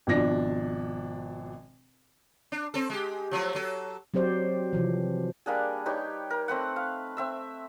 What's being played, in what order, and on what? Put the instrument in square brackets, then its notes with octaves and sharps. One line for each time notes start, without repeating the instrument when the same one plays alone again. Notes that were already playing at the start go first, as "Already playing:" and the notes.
[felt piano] G#1 B2 F3 D4 A#6
[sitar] D4
C4 A4
G#3 G4
F3 F#3 A3
F#3 A4
[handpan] F#3 C4 G4 C5 D5
C3 E3 F3
[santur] G3 A#3 D4 G#4
D#4 G4 B4 C#5
A#4
A3 C4 B4 F#5
F5
C4 E5 E6